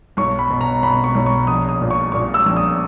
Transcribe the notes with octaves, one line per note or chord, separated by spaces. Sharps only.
B1 C#6
B5
B2
A#5
B2 B5
C#6
B1
C#6
A#1 D#6
D#6
A#2
C#6
A#2 C#6
E6
A#1
D#6